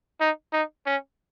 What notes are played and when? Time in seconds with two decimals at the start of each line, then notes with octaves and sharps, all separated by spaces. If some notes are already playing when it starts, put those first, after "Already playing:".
0.21 D#4
0.53 D#4
0.86 C#4